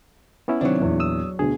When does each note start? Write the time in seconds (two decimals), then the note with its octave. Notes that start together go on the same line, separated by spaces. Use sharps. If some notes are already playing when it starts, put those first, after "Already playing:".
0.48 B3 C#4 E4
0.61 C3 D#3 F#3 C4 D4
0.80 A#1 E2
1.00 D#6 E6
1.39 D2 B2 D3 G#4